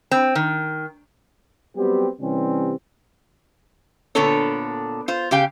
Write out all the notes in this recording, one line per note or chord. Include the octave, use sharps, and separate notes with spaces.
C4
D#3
F#3 G3 B3 C4 G4
C3 E3 G3 C4 C#4
A#2 D3 B3 D4 A4 C#5
F4 C5
C#3 G4 F5 G5